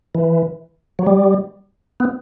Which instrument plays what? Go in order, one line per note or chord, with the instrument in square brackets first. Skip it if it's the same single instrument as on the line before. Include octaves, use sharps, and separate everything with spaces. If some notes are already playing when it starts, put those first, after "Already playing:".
[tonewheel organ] E3
F#3
G3
B3